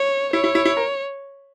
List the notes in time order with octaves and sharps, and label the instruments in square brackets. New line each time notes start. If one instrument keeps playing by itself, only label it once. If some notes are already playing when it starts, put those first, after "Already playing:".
Already playing: [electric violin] C#5
[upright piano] E4 [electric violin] C#5
[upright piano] E4
E4
E4
A#4